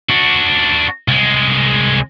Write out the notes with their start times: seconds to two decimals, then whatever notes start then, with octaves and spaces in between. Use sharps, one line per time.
0.09 D4 F#4
1.08 C2 G#3